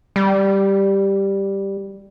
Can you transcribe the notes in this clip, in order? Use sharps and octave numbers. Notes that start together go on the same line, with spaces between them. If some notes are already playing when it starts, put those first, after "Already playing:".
G3